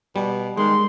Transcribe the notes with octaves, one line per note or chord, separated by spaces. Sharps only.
B2 G3
D#3 G#3 C6